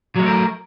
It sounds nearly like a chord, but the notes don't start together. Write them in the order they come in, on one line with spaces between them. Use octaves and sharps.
F#3 G#3 A3 A#4